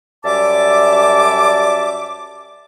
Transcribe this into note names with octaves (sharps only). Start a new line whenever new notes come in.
F#2 G3 D5 E5 A5 D6